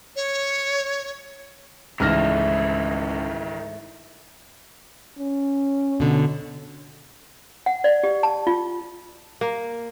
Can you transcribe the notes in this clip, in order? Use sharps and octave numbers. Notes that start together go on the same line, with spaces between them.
C#5
C#2 G#2 D#3 E3 A3 E4 F6 A#6
C#4
B2 D3
F#5
D5
G4
A5
F4
A#3